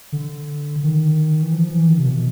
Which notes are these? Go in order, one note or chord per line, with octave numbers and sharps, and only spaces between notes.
D3
D#3
E3
F3
E3
D#3
C3
B2